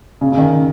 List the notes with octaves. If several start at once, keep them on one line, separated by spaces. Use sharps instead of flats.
C#3
C#3
D#3